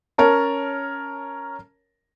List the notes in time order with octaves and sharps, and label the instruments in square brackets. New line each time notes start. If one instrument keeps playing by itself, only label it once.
[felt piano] C#4 A#4 C#5 A5